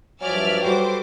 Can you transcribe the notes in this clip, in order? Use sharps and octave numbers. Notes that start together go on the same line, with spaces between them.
G2 F3 F#3 D5 E5 G#5 F6
G3 F#4 A4 B4 C5 G5 D6